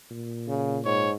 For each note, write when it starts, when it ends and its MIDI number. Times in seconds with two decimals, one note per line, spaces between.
0.11 1.08 46
0.48 0.78 49
0.85 1.14 44
0.85 1.11 73